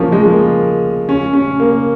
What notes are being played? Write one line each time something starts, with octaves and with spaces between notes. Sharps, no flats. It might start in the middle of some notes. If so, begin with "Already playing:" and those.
Already playing: F3 A#3 C#4
G#3
A#3
C#4
C#4
A#3